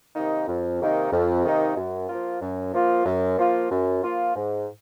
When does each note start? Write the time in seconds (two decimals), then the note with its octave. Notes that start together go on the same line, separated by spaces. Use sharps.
0.15 C3 D#3 A#3 D#4
0.47 F2
0.81 C3 D#3 A#3 D#4
1.12 F2
1.44 C3 D#3 A#3 D#4
1.77 F#2
2.09 F3 A#3 F4
2.41 F#2
2.73 F3 A#3 F4
3.05 F#2
3.38 F3 A#3 F4
3.70 F#2
4.03 F3 A#3 F4
4.35 G#2